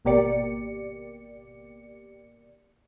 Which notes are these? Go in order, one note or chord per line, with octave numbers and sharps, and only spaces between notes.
G#1 B2 A#3 G4 D5 C#7